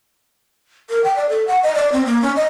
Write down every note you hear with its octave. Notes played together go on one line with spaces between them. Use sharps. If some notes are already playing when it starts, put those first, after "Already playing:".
A#4
G5
D5
A4
F#5
D#5
D5
C4
A#3
C#4
D#5